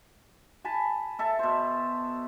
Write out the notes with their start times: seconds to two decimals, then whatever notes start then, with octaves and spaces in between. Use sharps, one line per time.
0.64 G#5 A5 B5
1.19 A4 E5 A5
1.39 B2 C5